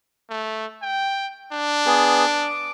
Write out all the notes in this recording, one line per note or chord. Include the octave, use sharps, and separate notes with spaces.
A3
G5
D4
B3 G#4
D6